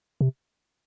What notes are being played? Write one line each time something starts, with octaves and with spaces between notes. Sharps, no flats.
C3